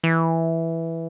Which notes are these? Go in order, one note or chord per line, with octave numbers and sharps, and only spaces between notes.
E3